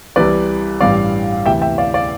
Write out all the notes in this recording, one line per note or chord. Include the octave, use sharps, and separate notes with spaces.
C2 C3 E3 G3 B4 D5
A1 G2 E3 G3 D5 F5
D2 C3 E3 E5 G5
E5 G5
D5 F5
D5 F5